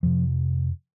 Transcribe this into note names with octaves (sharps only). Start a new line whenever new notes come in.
F2 C3 F3